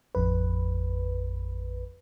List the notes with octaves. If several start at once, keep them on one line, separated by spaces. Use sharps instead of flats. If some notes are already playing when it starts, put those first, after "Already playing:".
A1 F2 B4